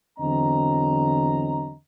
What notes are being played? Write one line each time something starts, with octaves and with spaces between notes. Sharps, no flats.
E2 D3 F#3 C4 D#5 A#5